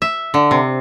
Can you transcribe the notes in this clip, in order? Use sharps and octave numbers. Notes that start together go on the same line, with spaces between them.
E5
D3
C3